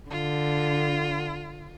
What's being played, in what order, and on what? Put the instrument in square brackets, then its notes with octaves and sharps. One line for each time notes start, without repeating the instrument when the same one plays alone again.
[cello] D3 [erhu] F4